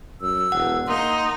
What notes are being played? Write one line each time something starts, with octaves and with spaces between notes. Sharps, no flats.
F#2 E6
E1 F#5
A#3 D#4 C6